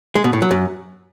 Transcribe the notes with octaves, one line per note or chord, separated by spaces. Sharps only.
G#3
B2
A2
F#3
F#2